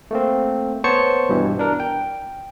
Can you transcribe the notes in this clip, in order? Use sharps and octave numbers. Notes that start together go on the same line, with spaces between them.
A3 A#3 C4
B3 C5 C#5 A5 C#6 C#7
G2 B2 E3
D4 A#4
G5